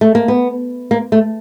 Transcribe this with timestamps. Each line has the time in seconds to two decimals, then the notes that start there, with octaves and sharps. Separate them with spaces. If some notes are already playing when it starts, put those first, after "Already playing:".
0.01 A3
0.15 A#3
0.28 B3
0.91 A#3
1.12 A3